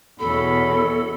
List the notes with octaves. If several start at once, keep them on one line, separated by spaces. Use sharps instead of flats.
E2 B2 C#4 F#4 A4 B5